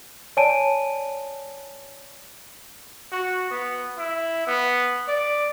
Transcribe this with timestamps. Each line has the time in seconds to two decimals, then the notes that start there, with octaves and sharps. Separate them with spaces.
0.37 C#5 D5 G#5 A5 D7 D#7
3.12 F#4
3.51 B3
3.98 E4
4.47 B3
5.08 D5